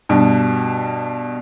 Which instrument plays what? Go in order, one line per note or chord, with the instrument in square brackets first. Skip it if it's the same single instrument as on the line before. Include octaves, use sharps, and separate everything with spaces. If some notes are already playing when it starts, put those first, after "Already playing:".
[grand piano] G2 B2